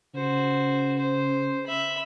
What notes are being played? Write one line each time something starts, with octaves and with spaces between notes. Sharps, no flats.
C#3 F#4 C5
C5
E5 B5